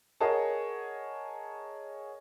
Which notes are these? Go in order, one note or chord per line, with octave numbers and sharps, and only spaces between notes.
G#4 A#4 C#5 D#5 F#5 A5